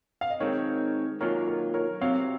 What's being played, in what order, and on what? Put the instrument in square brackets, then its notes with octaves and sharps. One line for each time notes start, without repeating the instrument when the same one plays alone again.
[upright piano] F5
D#5
[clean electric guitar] D#3 G#3 C4 [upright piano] A#4 C#5
[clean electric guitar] F#2 D#3 F#3 A#3 F4 [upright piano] A#4 C#5
[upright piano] A#4
A#4 C#5
[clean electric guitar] C3 F#3 C4 [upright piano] C#5 F5